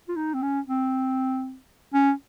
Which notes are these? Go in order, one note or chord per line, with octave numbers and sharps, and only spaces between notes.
F4
D#4
C4
C#4
C4
C#4